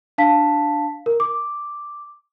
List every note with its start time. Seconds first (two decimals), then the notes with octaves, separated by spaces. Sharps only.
0.18 D4 F5 A5 B6
1.06 A#4
1.20 D6